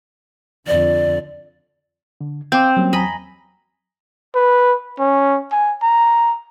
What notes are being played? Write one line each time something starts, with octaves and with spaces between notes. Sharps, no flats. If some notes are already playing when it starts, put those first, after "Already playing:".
F2 D3 D5
D3
C4 F5 G5 D6 G6
F#3 G3 A#3 C#4
E2 D#5 G#5 A#5 B5
B4
C#4
G#5
A#5